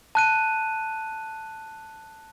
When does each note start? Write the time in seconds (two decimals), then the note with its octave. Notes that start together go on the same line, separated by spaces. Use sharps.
0.15 A5 F#6 D#7